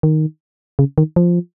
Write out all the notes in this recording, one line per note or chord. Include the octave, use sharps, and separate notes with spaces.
D#3
C#3
D#3
F3